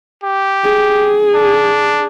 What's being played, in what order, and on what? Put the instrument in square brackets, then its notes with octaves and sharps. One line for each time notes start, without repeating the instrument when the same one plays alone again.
[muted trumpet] G4
[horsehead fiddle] G#4
[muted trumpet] D4